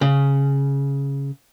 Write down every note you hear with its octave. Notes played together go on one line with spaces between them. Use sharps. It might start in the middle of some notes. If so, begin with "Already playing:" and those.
C#3